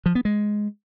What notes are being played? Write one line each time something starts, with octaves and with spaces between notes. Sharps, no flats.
F3
B3
G#3